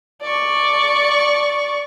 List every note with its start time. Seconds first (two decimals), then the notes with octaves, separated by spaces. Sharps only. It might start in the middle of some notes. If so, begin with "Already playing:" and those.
0.22 D5 C#6